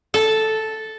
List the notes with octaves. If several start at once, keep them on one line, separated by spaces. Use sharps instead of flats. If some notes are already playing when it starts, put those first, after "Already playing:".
A4